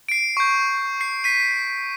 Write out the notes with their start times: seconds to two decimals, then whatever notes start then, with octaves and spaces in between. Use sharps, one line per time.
0.09 C7 D7
0.37 C#6 G6
1.01 C7
1.24 B6 D#7